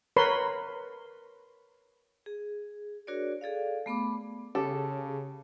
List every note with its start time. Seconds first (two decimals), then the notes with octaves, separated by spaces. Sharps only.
0.16 A#4 B4 C#5 B5 C6
2.26 G#4
3.07 D4 F#4 G#4 A#4 C#5 D5
3.41 G#4 A4 D5 F5
3.86 A3 B3 B5 D6
4.55 C#3 G4 A4